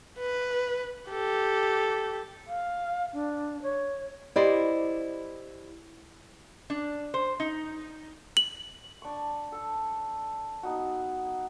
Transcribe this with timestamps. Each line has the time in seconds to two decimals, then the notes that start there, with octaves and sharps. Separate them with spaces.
0.18 B4
1.09 G4 A4
2.47 F5
3.13 D4
3.62 C#5
4.36 E4 G4 C5 D5 D#5
6.70 D4
7.14 C5
7.40 D#4
8.37 F#7
9.02 D4 C#6
9.52 A4
10.63 B3 D#4 F#4